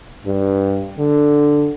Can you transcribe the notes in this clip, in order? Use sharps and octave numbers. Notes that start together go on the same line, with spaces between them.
G2
D3